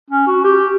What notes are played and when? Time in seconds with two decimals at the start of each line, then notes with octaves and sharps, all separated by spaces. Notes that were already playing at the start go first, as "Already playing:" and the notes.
0.10 C#4
0.27 F#4
0.44 G4